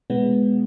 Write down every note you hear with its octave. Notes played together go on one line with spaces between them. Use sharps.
B2 G#3 B3